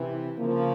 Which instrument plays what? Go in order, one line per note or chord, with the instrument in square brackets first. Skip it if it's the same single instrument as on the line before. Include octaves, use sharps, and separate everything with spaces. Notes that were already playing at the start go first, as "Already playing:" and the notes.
Already playing: [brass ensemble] C3 E3
[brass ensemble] C#3 F3 [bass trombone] A#3